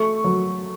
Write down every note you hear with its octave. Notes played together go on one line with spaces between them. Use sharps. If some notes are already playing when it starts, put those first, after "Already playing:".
Already playing: A3 C#6
F#3